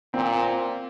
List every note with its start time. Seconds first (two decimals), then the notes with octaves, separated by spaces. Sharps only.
0.14 A#2 C4